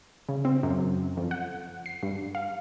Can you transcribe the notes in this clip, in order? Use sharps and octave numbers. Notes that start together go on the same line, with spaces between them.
C#3
C4
F#2
F2
F#5
C7
G2
F5